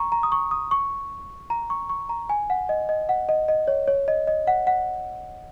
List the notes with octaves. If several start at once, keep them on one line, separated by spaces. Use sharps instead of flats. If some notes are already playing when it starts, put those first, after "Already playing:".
Already playing: A#5 C#6
A#5
D#6
C#6
D#6
C#6
A#5
C#6
C#6
A#5
G#5
F#5
D#5
D#5
F#5
D#5
D#5
C#5
C#5
D#5
D#5
F#5
F#5